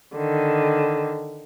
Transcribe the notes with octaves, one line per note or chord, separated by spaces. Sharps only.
D3 D#3